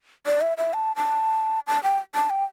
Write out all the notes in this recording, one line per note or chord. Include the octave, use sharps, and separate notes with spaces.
D5
E5
E5
A5
A5
A5
G5
A5
G5